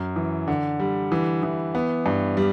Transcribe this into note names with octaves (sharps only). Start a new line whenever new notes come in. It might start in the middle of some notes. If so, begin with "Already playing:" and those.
Already playing: F#2
E3
D3
G3
E3
E3
B3
G2
G3